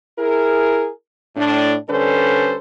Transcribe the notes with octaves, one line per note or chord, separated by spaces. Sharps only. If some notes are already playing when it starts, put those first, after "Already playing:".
E4 G#4 A#4
A2 D4
D3 G3 C#4 A4 B4 C5